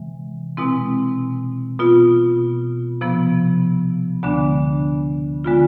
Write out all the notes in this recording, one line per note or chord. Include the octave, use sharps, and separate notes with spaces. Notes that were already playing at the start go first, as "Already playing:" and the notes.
Already playing: C3 E3 G#3
B2 G#3 C4 E4
B2 B3 F4
C3 F3 B3
D2 D3 G#3 B3 D4
D3 G#3 B3 F4